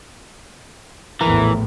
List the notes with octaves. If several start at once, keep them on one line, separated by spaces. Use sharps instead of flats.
A#1 E2 A2 E3 A#4